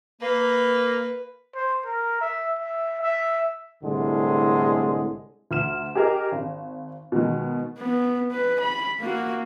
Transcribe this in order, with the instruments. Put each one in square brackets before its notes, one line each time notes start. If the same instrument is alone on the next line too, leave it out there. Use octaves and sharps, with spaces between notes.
[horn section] A#3 [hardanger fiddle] B4
[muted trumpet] C5
A#4
E5
E5
E5
[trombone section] C2 A2 D3 G#3
[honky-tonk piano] D2 F6 E7
G4 G#4 A#4 D#5
G#1
B2 D#3 G#3
[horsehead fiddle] B3
B4
B5
A#3 F#4